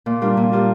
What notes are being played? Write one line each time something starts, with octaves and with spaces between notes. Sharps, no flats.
A#2
G3 D4 F4 A#4
A#2
G3 D4 F4 A#4